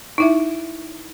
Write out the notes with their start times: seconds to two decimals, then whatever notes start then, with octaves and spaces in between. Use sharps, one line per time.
0.18 D#4 E4 E5